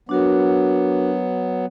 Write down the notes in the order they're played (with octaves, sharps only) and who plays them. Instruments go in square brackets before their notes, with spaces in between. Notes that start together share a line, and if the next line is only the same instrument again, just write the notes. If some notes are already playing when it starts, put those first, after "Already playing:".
[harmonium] F#3 B3 [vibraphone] D4 F#4 A#4